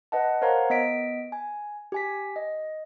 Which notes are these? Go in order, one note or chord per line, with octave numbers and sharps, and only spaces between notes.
B4 D#5 F#5 A5
A#4 C5 C#5 F5 F#5 A#5
B3 D#5 B6 D7
G#5
G4 G#5 B6
D#5